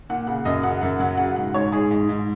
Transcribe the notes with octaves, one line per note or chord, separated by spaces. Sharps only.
A#2 F#5
C#3 F#5
F#2 D#5
C#3 F#5
F#2 F#5
F#3 F#5
C#3 F#5
G#2 F#5
G#2 C#5
G#2 G#4
G#2
G#2